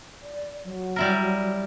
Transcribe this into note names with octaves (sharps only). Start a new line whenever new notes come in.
D5
F#3
G3 E4 A#4